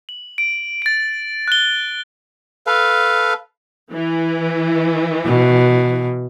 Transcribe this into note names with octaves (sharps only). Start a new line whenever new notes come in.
F#7
D7
A6 D7
F#6 G7
A4 B4 F5
E3
B2